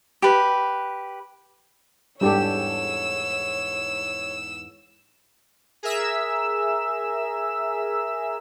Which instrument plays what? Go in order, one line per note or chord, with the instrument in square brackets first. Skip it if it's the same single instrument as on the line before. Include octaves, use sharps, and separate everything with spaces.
[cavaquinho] G4 B4
[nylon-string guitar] E2 G#2 A4 [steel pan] G3 D4 G4 [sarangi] C#5 [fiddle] E6
[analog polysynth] G#4 A#4 E5 E6